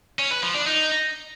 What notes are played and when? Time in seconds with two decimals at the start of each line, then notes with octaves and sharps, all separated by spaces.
0.19 C#4
0.31 B4
0.43 F3
0.54 D4
0.66 D#4